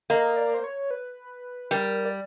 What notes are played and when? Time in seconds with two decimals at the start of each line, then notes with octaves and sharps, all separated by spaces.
0.10 A#3 D#5
0.36 D5
0.54 C5
0.64 C#5
0.91 B4
1.71 G3 A#4
2.05 D5